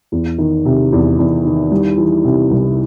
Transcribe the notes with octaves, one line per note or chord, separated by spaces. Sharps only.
E2
D#3
C3
E2
E2
D#3
G3
E3
C3
C2